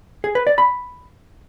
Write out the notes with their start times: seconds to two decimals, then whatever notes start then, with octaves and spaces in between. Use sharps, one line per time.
0.24 G#4
0.35 B4
0.47 D5
0.58 B5